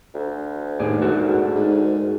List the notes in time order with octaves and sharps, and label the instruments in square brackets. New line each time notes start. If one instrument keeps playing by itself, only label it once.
[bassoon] D2
[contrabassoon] D#2 [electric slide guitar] A2 G#4 D5
[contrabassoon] G#2 [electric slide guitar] F#4 A4 A#4
[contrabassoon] G#2